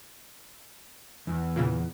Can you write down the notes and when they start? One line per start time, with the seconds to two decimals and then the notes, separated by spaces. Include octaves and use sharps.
1.27 E2
1.56 A#2 C#3 E3